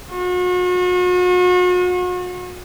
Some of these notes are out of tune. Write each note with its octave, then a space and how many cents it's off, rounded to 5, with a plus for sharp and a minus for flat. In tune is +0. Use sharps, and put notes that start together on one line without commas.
F#4 -40